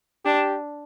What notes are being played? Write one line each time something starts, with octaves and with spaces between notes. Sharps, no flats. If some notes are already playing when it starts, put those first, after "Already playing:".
D4 G4